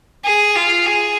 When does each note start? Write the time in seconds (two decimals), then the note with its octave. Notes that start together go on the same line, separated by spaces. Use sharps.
0.24 G#4
0.55 F4
0.86 G#4